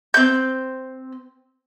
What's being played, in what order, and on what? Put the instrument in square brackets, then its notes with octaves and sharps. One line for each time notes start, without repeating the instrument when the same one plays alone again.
[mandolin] C4 G6